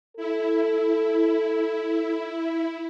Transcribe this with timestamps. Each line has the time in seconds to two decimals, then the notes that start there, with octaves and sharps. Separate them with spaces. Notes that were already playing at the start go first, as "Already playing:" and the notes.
0.17 E4 A4